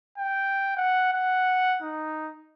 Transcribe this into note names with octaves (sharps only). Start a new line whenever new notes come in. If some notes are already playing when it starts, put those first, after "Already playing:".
G5
F#5
F#5
D#4